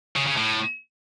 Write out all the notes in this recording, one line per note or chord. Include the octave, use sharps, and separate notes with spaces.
C#3
C#3
A2